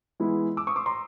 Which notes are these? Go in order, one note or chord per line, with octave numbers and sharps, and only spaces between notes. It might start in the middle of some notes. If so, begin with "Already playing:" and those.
E3 G#3 B3 E4
D6 E6
C#6 D#6
C6 D6
A#5 C6